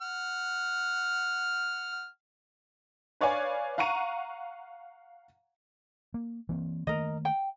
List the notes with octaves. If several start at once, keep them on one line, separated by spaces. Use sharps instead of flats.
F#5 F6
B4 C#5 D5 F5 G#5
F5 F#5 A#5 C#6 D#7
A#3
E3 A#3 C4
D#3 A3 A#3 A#4 D#5
G5